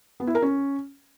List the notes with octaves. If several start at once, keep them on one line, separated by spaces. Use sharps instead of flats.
B3
E4
A#4
C#4